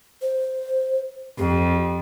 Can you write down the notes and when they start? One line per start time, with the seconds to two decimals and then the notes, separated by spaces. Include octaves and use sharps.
0.22 C5
1.38 F2 G4